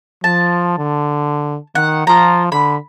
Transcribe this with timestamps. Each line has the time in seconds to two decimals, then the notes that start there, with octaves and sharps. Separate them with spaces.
0.24 F3 A5
0.78 D3
1.75 D#3 F#5
2.07 F3 F4 A#5
2.52 D3 B5